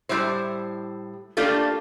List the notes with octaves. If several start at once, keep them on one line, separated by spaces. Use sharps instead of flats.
A2 F3 G3 E4 C5
A3 A#3 D4 F4 G4 A4